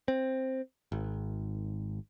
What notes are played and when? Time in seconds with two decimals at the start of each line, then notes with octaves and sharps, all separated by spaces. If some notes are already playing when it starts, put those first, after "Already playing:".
0.08 C4
0.92 G#1